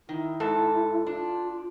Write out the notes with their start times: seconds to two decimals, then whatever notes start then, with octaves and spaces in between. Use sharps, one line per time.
0.09 D#3 E4
0.40 G#2 A4
1.07 D4 F4